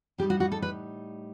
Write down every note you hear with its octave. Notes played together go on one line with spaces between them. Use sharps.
A2 G3 D#4 G4
F#4
F#4
A4
B4